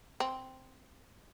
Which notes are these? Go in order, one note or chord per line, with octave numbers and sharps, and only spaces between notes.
C4